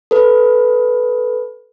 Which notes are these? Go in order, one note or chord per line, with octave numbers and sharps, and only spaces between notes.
A4 B4